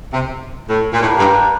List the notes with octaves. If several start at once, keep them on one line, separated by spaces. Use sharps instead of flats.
C3
A2
A#2
A2 A#3 D4 G4 B4
G2